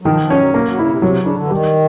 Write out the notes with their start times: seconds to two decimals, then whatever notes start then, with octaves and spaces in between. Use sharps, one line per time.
0.02 F#3
0.05 D#3 F3
0.22 F3
0.30 C#4
0.38 F#3
0.54 F#3 A#3
0.66 F#3
0.78 C#3 E4
0.90 C3
1.02 C3 F#3
1.18 C#3
1.26 D4
1.34 D3
1.44 E3
1.50 D#3 G3